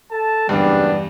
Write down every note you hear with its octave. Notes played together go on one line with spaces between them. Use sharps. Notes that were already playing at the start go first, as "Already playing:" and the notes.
A4 A5
F#1 E2 G2 G3 B3 D4